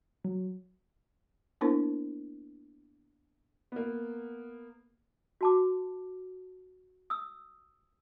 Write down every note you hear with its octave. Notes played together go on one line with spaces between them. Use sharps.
F#3
A#3 B3 D4 E4 A#4 C5
A#3 B3
F#4 A5 D6
D#6 E6